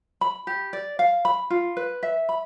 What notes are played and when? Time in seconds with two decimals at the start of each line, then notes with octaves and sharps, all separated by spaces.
0.21 B5
0.47 G4
0.73 D5
0.99 F5
1.25 B5
1.50 F4
1.77 B4
2.03 E5
2.29 B5